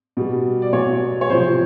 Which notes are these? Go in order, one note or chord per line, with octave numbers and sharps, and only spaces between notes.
B2 G3
D5
B2 F#3 C#5
C#5
C3 F3 C5